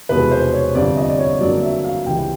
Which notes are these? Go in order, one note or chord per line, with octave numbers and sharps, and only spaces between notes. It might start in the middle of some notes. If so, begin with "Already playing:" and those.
F1 E2 B2 G#3 B4
C5
C#5
G1 F2 C3 D5
D#5
D5
C#5
G1 F2 C#3 F#3 A#3 D5
E5
F5
C#2 C3 E3 G3 G5